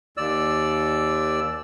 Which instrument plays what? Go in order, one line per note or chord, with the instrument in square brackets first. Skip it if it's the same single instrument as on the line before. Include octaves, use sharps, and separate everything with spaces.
[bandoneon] D#2 D5 E6